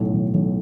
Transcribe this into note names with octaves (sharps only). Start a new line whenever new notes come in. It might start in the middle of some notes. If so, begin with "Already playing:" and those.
Already playing: B1 A2
B1
B1